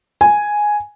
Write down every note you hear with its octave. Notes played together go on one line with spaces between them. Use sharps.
G#5